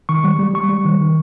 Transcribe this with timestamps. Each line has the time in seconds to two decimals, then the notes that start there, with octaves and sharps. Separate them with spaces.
0.09 D#3 C#6
0.24 G3
0.39 G3
0.54 G3 C#6
0.69 G3
0.85 D#3
1.01 D#3